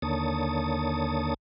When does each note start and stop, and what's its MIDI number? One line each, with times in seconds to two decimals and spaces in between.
0.02 1.34 39
0.02 1.34 50
0.02 1.34 58
0.02 1.34 73
0.02 1.34 81
0.02 1.34 87